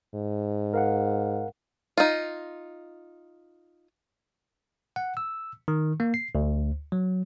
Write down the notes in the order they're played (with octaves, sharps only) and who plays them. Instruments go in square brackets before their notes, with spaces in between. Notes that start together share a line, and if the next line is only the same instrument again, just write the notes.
[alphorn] G#2
[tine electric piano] A#4 F5 F#5
[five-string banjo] D#4 F4
[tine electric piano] F#5
E6
D#3
A#3
C7
D2
F#3